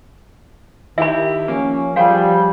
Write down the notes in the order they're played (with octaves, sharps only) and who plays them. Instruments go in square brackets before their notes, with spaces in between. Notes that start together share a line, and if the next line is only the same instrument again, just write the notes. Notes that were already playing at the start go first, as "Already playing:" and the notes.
[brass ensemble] D#3 [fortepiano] E4 G4 [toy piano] E5 B5
[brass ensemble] F3 C#4 [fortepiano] A#3
[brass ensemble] F3 [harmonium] G3 [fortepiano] G#4 C5 G5 [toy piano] F5